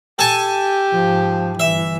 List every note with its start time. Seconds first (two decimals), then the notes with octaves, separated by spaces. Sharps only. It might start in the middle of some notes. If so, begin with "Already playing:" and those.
0.19 G4 A4 G#5 A5
0.91 G#2 F3
1.60 G1 E3 E5